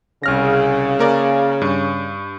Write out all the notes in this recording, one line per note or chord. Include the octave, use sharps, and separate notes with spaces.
C2 C#3 F6 A#6
A#3 A#4 D5
G2